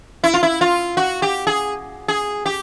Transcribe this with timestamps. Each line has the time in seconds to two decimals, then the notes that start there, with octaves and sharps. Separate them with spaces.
0.24 E4
0.34 F4
0.43 E4
0.61 F4
0.97 F#4
1.22 G4
1.47 G#4
2.08 G#4
2.46 G4